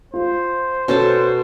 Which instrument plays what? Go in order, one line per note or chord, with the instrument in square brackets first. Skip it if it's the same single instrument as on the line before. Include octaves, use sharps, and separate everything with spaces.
[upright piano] F4 [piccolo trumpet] C5
[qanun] B2 A4 A5 [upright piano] C#4